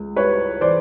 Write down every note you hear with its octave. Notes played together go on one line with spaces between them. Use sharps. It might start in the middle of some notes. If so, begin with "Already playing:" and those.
Already playing: C#2
G3 B4 C#5
E3 C5 D5